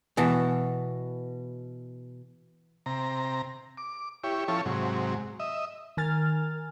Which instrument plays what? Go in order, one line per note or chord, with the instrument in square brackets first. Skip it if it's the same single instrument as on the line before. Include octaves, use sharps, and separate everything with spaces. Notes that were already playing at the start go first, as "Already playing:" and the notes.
[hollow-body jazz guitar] B2 [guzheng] E3 F#4 A5
[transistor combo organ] C3 A#5
D6
E4 G4 C#5
F3 C#4 E4 A4 C#5
G#2 C3 F#3
D#5 E5
[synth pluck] D#3 A#4 G#5 F6 A6